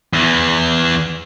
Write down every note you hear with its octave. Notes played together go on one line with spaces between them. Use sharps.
E2 E3